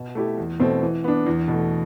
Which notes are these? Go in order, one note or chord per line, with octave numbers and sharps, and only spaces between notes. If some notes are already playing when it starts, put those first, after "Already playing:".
Already playing: B2
A3 E4 G4
E2
B2 A3 C4
E3
B3 D4
E2
B2
A3